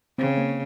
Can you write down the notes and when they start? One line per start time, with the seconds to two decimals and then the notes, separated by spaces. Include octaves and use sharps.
0.18 C#3 C4
0.38 A#3